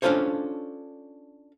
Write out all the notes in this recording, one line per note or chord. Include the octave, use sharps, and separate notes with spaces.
C#4 D4 F4 A4 C5 C#5